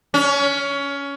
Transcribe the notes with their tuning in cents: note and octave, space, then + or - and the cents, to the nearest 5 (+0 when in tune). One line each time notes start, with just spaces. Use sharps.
C#4 +20